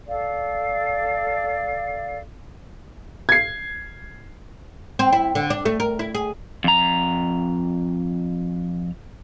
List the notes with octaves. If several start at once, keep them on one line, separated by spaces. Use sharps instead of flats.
A4 D5 F5
G#6 C7
C4
E4
D3
D4
A3
A#4
E4
G#4
F2 A#5